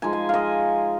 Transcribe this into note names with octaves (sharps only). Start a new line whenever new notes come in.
F3 G#3 D#4 G#5
G#5
D#5 F5